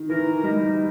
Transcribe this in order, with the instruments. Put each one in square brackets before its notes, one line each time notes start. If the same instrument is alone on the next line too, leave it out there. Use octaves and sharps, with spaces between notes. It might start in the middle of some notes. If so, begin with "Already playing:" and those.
Already playing: [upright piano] D#3
[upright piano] E3 [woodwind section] A#4
[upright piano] G3 [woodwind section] D#4